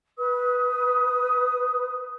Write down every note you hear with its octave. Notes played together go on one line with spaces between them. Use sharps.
B4 D#6